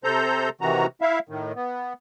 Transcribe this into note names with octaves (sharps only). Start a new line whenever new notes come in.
C3 A4 C5 A#5 G6
C3 D#3 E3 F#4 A#5
E4 E5 F5
A2 D#3
B3